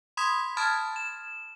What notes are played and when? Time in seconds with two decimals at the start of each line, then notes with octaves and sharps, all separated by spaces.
0.17 B5 C6 D#6 G#6 B6
0.57 A5 B5 D#6 F6 G#6 A6
0.96 E7